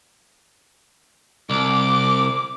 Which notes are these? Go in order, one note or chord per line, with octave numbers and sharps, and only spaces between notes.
C2 D6